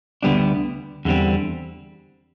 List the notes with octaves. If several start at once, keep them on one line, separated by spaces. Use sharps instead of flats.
D2 D3 G3 B3 D4
E2 D3 G3 C4